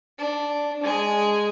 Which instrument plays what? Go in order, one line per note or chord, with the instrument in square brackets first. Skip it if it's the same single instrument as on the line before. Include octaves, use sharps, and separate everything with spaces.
[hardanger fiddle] D4
G#3 G#4